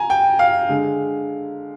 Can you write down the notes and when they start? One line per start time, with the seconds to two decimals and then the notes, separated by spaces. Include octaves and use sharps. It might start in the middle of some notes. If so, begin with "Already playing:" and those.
Already playing: G#5 A#5
0.10 G5
0.39 F5
0.69 D3 G#3